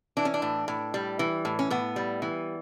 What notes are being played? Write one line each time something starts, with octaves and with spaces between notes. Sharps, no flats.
E3 D4
C#4
D4
A2
A2
G3
E3
A2
C#4
A2 B3
G3
E3